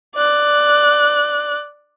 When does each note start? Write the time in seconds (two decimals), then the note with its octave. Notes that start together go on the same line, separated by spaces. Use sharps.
0.15 D5 F#6